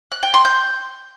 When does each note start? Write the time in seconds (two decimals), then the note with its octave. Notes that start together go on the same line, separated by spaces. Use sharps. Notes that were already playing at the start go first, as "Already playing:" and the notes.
0.12 F#6
0.23 G5
0.34 C6
0.45 G6